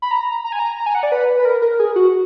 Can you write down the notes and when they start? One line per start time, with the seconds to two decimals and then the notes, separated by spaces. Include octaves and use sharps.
0.02 B5
0.11 A#5
0.45 A#5
0.52 G#5
0.59 A#5
0.78 A#5
0.86 G#5
0.95 F#5
1.03 D5
1.12 B4
1.39 B4
1.45 A#4
1.62 A#4
1.79 G#4
1.96 F#4